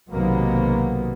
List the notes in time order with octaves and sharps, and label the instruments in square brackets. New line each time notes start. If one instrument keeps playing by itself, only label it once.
[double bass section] B1 C3 D#3 F#3 A#3 B3